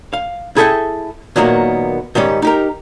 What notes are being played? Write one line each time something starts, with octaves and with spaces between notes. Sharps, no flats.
F5
E4 G#4 A4 E5 F5 G5
A#2 D#3 F#3 A#3 B3
G#2 D#3 G3 C#4
D#4 G4 A#4